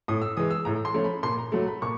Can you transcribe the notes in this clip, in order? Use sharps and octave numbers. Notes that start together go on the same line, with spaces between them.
A2 D#6
E6
E3 G#3 D#6
E6
A2 A#5
C6
F3 A3 C#4
B5
A#2 C6
A#5
F#3 A3
B5
A#2 C#6